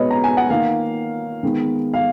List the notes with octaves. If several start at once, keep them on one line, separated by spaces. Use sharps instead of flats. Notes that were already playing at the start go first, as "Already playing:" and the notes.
Already playing: B2 G#3 B3 B4 C#5 D#5
A#5
G#5
F#5
D#3 A#3 F5
D#3 G#3 B3
F5